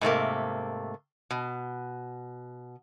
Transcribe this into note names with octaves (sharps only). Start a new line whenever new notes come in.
G#2 C3 A3 A#3
B2